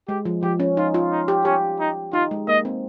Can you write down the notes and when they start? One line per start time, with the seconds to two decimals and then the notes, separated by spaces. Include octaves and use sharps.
0.08 G#3 G4
0.25 F3
0.43 F3 G4
0.60 C#4
0.77 D#4 F4
0.94 F4
1.11 D#4
1.28 G4
1.45 C#4 G4
1.80 D#4
2.13 D#4 F4
2.31 G#3
2.48 A#3 D#5
2.65 C4